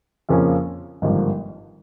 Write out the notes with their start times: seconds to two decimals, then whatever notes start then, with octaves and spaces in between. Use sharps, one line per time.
0.29 F2 C#3 F3 A#3 C#4
1.02 G#1 G2 D3 F3 A#3